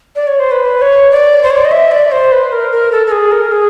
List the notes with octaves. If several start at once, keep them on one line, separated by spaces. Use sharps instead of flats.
D5
C#5
C5
B4
C#5
D5
C5
C#5
D5
D#5
E5
D5
C5
B4
A#4
A#4
A4
A4
G#4
A#4
G#4